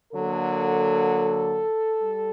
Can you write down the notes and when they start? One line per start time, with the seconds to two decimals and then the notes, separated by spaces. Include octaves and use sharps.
0.13 D3 F#3 A#3 A4
2.03 G3